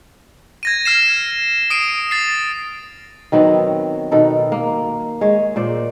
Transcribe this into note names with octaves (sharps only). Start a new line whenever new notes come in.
G#6 A#6 D#7
F6 C7 E7
D#6 C7 D7 D#7
A6 C7
D#3 F#3 B3 C4
B2 D#3 A4 A#4
A#3
G#3 C#5
A#2 C5 D5